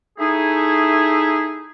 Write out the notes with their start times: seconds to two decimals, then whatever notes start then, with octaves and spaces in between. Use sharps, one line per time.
0.18 A3 D#4 E4 G#4